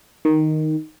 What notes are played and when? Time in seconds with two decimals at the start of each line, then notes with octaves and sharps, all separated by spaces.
0.25 D#3